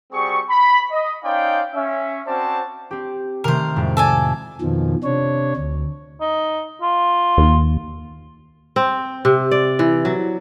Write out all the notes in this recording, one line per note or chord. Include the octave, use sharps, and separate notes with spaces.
G3 C4 F#4 G#4 C#6
B5
D#5
C#4 D#4 C5 D5 F5 G5
C#4 E5
C4 C#4 F#4 C5 D5 A5
C4 G4
C3 D#3 A3 A#4 C5
F2 A2 G#3
A4 D5 G#5
F2 B2 D#3 F3
C3 D4 C#5
D2
D#4
F4
D#2
C4
C3
D5
E3
F#3